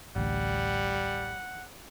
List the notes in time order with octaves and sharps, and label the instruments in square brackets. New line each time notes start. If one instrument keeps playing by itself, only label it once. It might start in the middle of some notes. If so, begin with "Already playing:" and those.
[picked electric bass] A1 D2 [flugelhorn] G3 [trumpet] F#5